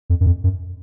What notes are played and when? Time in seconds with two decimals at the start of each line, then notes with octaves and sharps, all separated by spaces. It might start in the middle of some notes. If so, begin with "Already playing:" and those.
0.10 F2
0.21 F#2
0.26 F2
0.44 F#2